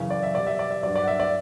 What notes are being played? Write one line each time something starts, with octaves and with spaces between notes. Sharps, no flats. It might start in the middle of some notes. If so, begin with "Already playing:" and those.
Already playing: F#2 C#3 E3
D5
E5
B2 G3 D5
E5
D5
E5
G2 F#3 D5
D5
F#5
E5
D5